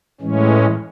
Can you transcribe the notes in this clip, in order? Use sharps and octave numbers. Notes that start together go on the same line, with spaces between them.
A2 E3 G#3 C#4